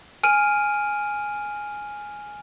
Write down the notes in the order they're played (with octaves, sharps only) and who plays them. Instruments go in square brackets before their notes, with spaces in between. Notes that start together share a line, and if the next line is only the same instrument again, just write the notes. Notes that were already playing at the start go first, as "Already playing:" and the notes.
[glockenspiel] G#5 F6 D7 D#7